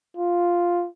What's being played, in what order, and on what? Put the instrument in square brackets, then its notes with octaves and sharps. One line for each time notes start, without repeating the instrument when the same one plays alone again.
[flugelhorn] F4